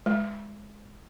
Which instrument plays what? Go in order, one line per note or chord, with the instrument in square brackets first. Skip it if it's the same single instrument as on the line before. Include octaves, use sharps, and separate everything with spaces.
[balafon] G#3